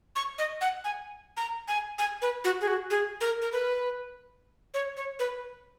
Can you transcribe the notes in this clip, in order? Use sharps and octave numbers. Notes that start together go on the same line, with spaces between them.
C#6
D#5
F#5
G#5
A#5
G#5
G#5
B4
F#4
G#4
F#4
G#4
A#4
A#4
B4
C#5
C#5
B4